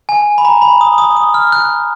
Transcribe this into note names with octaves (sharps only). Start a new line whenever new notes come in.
G#5
B5
A#5
B5
D#6
D#6
D#6
F6
F#6